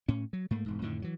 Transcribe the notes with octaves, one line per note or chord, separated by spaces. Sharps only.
A2 C#4
F#3
G#2 A3 A#3
E1 G#2
F2 A2 D3 D#3
E3 F#3